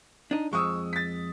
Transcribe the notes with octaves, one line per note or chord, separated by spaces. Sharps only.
D4 D#4
F2 G#3 C#6 D#6 E6
A6 B6